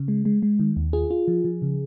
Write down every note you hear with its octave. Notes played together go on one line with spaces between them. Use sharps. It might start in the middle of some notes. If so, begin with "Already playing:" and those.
Already playing: C#3
G#3
G#3
G#3
D#3
D#2
F4 G#4
F4
F3
F3
C#3